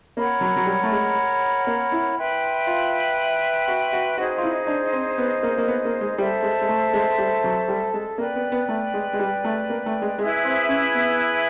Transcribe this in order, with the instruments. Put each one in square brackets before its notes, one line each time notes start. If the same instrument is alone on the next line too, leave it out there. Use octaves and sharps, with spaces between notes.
[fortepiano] A#3 [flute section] A#4 C#5 F#5 B5
[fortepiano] F#3
F#3
G3
A3
G#3
A#3
E4
[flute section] B4 E5 G5 C6
[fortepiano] F4
F#4
F#4
[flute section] D#4 G#4 C5 D#5 [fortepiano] F#4
[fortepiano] F4
E4
D4
C4
B3
A#3
A#3
B3
A#3
G#3
[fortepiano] G3 [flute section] A4 C5 E5 A5
[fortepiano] G#3
G#3
A3
G#3
G3
F#3
G3
G#3
[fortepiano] A#3 [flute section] B4 D5 G5
[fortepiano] B3
B3
A3
G#3
G#3
G3
A3
A#3
A3
G#3
[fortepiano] G#3 [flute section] E4 G#4 B4 E5
[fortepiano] C4
C#4
B3